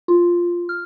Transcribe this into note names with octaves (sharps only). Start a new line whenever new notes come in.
F4
F6